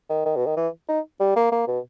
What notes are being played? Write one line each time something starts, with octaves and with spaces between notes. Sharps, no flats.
D#3
D#3
B2
D#3
E3
D#4
G3
A#3
A#3
B2